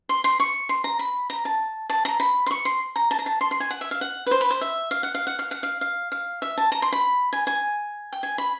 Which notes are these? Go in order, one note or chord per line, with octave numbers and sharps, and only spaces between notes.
C6
C6
C#6
C6
A#5
B5
A#5
A5
A5
A#5
B5
C6
C#6
C6
A#5
A5
A#5
A5
C6
C6
G#5
F#5
E5
F5
F#5
B4
C5
B4
C5
E5
F5
F#5
F5
F#5
F5
F#5
F5
F5
F5
E5
A5
A#5
C6
B5
G#5
G#5
G5
G#5
B5